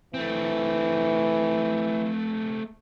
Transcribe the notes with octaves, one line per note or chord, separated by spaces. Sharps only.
E3 A3 C4